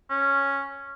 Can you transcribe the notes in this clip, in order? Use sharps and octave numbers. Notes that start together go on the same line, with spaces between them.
C#4